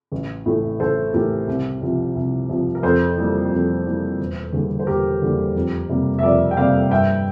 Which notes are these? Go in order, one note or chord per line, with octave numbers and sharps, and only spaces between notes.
A1
A2 E3 A3
A1 A4 C5
A2 E3 A3 G4 A#4
C2
C3 F3
C2
C3 F3
A#4
F2 A4 C5
E3 G3 A#3
F2
E3 G3 A#3
E1
E2 D3 G3 A#3
C5
E1 G4 A#4
E2 D3 G3 A#3
F2
C3 G3 A#3
E5
F2 A#4 D5
G5
C3 G3 A#3 D5 F5
G2 E5 G5